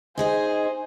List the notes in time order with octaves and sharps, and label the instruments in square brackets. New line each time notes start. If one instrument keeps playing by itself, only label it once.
[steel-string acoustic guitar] D#4 G#4 D#5 [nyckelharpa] C5 [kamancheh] G#5